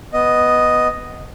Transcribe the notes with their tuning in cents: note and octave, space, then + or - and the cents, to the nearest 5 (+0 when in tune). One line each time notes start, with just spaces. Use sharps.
B3 +0 D#5 +0